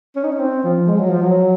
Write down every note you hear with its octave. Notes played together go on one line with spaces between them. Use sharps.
C#4
D#4
C#4
C4
F3
G#3
F#3
F3
F#3